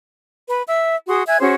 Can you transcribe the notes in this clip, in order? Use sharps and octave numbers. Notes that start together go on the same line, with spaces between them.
B4 B5
E5 E6
F#4 G#4 C6 D#6
E5 G#5 F#6 G#6
C#4 F#4 G#4 C5